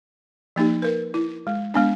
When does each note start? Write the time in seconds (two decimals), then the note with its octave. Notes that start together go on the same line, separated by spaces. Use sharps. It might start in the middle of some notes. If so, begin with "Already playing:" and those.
0.56 F3 A#3 D#4 G4
0.82 A#4 B4
1.14 E4
1.47 G#3
1.74 G#3 B3 D4